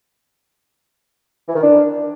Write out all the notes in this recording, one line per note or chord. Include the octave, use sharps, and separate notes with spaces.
E3
D#3
D4